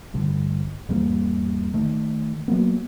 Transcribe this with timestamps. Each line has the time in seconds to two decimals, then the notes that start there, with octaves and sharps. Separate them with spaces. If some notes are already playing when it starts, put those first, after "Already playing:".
0.13 A1 G2 D3
0.89 E2 G#2 G3 A#3
1.74 D#3 A3
2.48 F#3 A#3 B3